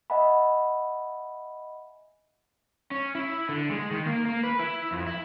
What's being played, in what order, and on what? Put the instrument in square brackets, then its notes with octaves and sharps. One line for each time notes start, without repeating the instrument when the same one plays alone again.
[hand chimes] D#5 E5 F#5 G#5 B5
[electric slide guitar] C#4
E4
D3
G#3
D#3
A#3
A#3
B4
E4
F2
E4